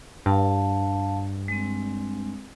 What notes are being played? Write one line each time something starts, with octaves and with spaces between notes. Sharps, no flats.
G2 F5 A5
G#3 C4